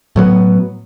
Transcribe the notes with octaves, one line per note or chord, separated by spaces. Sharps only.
A2 F#3 B3